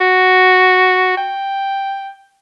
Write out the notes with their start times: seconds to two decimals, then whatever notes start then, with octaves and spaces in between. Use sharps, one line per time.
0.01 F#4
1.17 G5